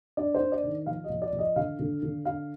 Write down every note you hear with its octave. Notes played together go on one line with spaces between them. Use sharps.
D4 D5
C5
D4
D5
D#3
F3 F5
D#5
F3
D5
F3
D#5
D3 F5
D3
D3
D4 F5